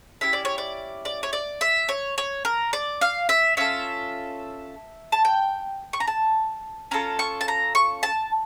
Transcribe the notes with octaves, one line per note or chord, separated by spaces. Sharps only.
C#4 E4 G4 E5
D5
C#5
D5
D5
C#5
D5
E5
C#5
C#5
A#4
D5
F5
E5
C#4 F4 A4 E5
A5
G5
C#6
A#5
A5
C#4 F4 A4 A#5
C#6
A5
A#5
C#6
A5